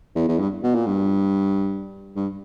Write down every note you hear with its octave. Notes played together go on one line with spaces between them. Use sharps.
E2
E2
G2
B2
A#2
G2
G2